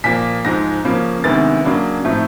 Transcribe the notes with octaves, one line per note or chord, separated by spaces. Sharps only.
A#2 F3 A#3 B6
G#2 F3 G#3 A#6
C#3 F3 A#3 C#4
D2 C3 D#3 G#3 B3 A6
C#3 F#3 A#3 D4
A2 F3 A3 C4 D#4